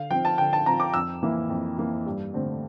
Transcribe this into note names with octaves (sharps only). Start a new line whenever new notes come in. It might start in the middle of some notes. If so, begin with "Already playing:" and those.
Already playing: D3 F5
F3 C4 G5
A5
D3 G5
A5
F3 C4 A#5
D6
F2 E6
E3 A#3 E4
F2
E3 A#3 E4
G2
D3 A3 C4